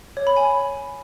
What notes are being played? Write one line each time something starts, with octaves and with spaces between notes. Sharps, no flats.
C#5
B5
G#5